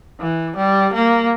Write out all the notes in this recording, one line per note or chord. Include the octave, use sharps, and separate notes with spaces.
E3
G3
A#3